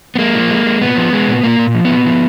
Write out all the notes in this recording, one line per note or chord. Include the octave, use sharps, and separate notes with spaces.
B3
G#3 A#3
F3
G#3
G#3
A#2 B3
F3
G#3
A#2
A#2 A#3
A#2
F3
B3
A#2
F3